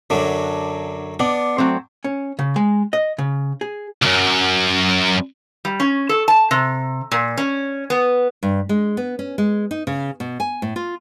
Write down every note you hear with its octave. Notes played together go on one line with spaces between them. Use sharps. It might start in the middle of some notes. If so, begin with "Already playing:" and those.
F#2 D3 F#3 D4
B3 D4 D5
F#3 A3 C4
C#4
C#3
G#3
D#5
C#3
G#4
C#2 F#2
G3
C#4
A4
A5
C3
A#2
C#4
B3
G2
G#3
B3
C#4
G#3
D#4
C#3
B2
G#5
A2
F4